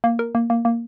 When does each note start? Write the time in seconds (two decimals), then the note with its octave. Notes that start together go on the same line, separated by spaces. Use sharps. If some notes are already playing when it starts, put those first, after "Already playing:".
0.04 A#3
0.19 A#4
0.35 A#3
0.50 A#3
0.65 A#3